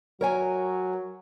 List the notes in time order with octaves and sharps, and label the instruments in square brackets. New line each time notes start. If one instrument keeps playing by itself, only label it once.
[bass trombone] F#3 [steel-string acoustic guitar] A#4 C#5 G#5